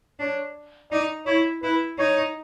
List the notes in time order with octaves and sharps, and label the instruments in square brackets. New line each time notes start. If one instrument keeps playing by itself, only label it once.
[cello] D4 [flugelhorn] C#5
[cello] D#4 [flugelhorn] D5
[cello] E4 [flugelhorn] C#5
[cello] E4 [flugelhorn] B4
[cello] D#4 [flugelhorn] C#5